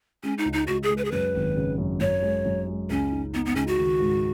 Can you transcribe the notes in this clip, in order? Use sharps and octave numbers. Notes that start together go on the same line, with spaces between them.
G#3 C#4
D#4
C#2
D#4
C#2 F#4
G#4
G#3
B4
G#4
F#2 B4
G#1
C#3
F#2
F#2 C#5
G#3
F#2
G#3
C#2 C#4
D#4
B3 D#4
B3
C#2 C#4
F#4
D#3
G#2